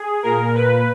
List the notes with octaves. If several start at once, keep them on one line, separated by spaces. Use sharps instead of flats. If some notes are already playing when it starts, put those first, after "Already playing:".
Already playing: G#4
A#2 A#4
B4